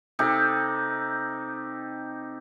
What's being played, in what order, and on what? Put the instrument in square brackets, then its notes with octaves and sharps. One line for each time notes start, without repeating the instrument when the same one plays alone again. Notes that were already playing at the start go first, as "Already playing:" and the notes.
[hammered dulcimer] C3 D#4 G4 A4